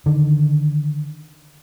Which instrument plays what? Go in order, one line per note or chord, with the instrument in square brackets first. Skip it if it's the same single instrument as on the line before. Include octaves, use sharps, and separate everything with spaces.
[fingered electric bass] D3 D#3